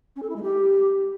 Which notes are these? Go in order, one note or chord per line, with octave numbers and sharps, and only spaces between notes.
C#4
A4
E4
G#3
G4